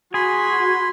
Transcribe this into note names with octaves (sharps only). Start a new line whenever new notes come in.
F#4 G#4 B5 C6